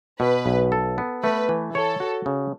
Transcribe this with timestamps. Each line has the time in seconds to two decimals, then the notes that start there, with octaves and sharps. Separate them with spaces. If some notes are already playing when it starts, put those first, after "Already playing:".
0.20 B2 B4
0.46 B1
0.72 A4
0.98 B3
1.23 A3 B4
1.49 E3
1.75 A4 C#5
2.00 F#4
2.26 C#3